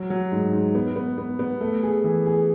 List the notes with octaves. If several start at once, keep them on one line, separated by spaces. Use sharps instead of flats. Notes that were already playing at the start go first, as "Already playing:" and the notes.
Already playing: F#3
F#3
G#2
G#2
B3
B3
B3
B3
A3
G#4
E3
G#4